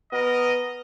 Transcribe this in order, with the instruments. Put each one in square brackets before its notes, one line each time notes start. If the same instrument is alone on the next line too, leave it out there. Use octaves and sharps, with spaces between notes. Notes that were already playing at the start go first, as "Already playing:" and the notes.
[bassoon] B3 [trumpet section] A#4 D#5